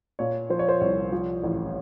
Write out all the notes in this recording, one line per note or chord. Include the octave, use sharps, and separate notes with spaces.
A#2 C#5
F3 C5
C#5
C5
C2 C#5
F3
A1